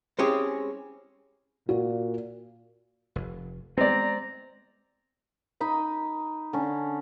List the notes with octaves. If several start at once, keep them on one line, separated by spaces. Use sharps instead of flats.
G#3 C4 C#4 E4 G4 G#4
A#2 F#4
F1
G#3 B3 C4 D5 A#5
D#4 D#5 B5
D3 C#4